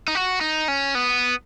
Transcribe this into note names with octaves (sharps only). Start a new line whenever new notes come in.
D#4
F#4
D#4
C#4
B3